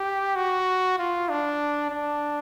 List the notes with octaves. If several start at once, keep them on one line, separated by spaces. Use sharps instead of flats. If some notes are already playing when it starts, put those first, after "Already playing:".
Already playing: G4
F#4
F4
D4
D4